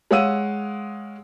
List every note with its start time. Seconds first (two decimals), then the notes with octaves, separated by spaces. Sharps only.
0.11 G#3 C#5 F5 F#5 E6 D#7